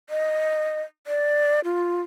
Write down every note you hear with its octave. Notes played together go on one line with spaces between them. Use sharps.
D#5
D5
F4